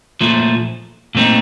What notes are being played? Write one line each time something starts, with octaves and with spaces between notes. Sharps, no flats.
A#2 F3 A3
A#2 A3 C4 D#4